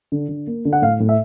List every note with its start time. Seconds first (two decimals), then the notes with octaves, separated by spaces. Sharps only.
0.12 D3
0.29 D3
0.47 A#3
0.65 D3
0.73 F#5
0.82 A2 F5
1.00 A2
1.09 E5